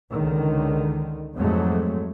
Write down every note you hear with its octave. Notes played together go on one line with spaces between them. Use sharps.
C#2 D3 D#3
F2 G#2 F#3 G#3 A3